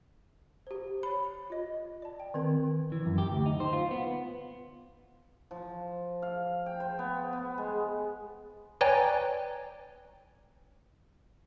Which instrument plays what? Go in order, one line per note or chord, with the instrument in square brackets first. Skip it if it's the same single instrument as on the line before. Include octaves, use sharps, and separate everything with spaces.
[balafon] G4 C5
C#5 B5
F4 D#5
D5 A5
G5
D#3 C4 A#4
[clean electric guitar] E3
F#2
G4
D2
D#4
C5
F4
B3
[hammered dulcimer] F3
F5
G5
C5
B3
B3
G#3
[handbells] B4 C#5 D5 G5 G#5 A#5